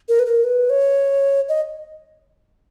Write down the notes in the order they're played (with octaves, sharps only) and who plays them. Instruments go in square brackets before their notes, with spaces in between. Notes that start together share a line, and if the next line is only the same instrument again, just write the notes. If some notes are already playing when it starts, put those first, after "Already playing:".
[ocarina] A#4
B4
A#4
B4
C#5
D#5